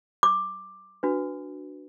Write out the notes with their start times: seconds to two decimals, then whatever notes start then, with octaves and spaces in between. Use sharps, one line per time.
0.23 D6
1.03 D4 F#4 B4